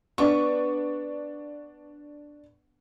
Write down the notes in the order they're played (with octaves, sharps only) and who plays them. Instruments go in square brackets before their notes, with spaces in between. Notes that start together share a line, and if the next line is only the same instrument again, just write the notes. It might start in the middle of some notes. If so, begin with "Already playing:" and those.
[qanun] B3 [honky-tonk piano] D4 C#6